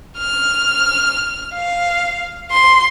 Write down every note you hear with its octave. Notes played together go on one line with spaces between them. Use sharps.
F6
F5
C6